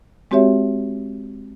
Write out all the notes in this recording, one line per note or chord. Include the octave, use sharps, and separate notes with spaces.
G#3 C4 F#4 G4 C#5 E5